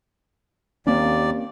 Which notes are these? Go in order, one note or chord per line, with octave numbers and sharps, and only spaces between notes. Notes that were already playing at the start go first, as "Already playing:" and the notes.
D#2 A#3 C4 C#4 D5